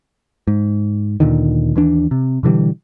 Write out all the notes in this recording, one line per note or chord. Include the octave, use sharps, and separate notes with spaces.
G#2
D2 A#2 D3 D#3
D#2 E3 D4
C3
B2 D3 E3 G3